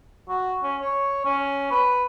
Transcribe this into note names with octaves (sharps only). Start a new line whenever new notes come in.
F#4
C#4
C#5
C#4
B4